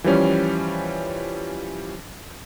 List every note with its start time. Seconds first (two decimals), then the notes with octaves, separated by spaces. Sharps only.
0.04 E3 F3 G3 C#4